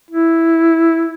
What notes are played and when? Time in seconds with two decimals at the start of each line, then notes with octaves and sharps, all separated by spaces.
0.10 E4